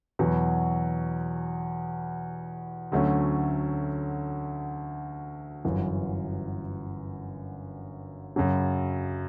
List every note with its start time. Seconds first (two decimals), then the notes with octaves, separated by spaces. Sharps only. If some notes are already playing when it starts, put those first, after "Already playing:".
0.19 E2 B2 F#3 B3
2.92 D2 D3 F#3 A3 C#4
5.65 G1 F#2 E3
8.36 F#2 C#3 F#3